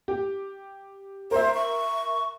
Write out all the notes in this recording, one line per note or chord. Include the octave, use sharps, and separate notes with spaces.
G4
A#4 C5 E5
C#6